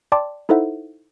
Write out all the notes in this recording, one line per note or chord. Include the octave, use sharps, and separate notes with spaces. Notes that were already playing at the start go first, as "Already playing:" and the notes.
D5 G5 A5 C6 D6
D#4 E4 A4 C5 E5 F#5